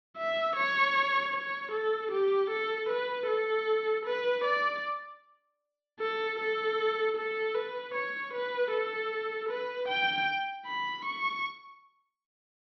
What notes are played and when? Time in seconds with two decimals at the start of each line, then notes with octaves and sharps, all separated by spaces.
0.17 E5
0.57 C#5
1.33 C#5
1.72 A4
2.12 G4
2.50 A4
2.89 B4
3.28 A4
4.06 B4
4.44 D5
6.00 A4
6.39 A4
7.16 A4
7.55 B4
7.94 C#5
8.33 B4
8.72 A4
9.49 B4
9.88 G5
10.66 B5
11.05 C#6